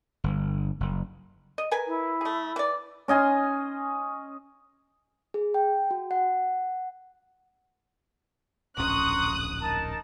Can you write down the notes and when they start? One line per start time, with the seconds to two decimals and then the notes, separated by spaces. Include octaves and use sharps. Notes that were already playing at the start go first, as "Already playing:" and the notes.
0.24 G1
0.80 F#1
1.58 D#5
1.71 A#4 B4 G#5
1.87 E4
2.21 A3 G#4
2.56 E3 D5
3.08 C#4 D#5 G#5 C6
5.34 G#4
5.54 G5
5.91 F#4
6.11 F#5
8.78 D1 A#1 C#4 A#5 C6 C#6 D#6 F#6
9.62 D#4 A#4 A5